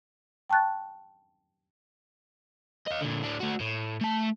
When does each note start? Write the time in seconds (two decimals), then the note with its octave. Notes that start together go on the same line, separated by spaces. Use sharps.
0.50 G5 A5 C#6 F#6 A6
2.86 D#5 F5
3.00 A#2 D3
3.23 A2 D4
3.40 A3 F#4
3.60 A2
4.01 A3 A5